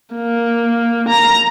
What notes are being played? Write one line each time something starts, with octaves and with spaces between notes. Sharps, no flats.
A#3
A#5